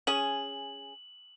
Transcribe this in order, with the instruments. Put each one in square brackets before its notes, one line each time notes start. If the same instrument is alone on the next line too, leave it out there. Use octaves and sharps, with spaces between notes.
[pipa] C#4 G#4 [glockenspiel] F#7